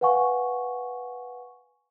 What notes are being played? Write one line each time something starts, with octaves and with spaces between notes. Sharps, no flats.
B4 F5 F#5 G#5 C#6